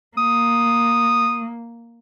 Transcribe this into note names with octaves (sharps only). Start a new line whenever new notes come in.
A#3 D#6